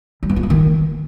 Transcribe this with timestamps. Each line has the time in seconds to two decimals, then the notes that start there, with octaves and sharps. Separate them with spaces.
0.23 G3
0.29 B3
0.36 F4
0.43 A#3
0.50 D#3